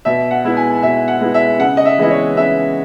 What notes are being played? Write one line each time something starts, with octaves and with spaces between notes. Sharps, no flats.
B2 E5
F#5
G#3 B3 E4
G#5
B2 E5
F#5
G#3 B3 E4
E5
C#3 F#5
D#5
E5
E3 G#3 B3 E4 D#5
C#5
C#3 E5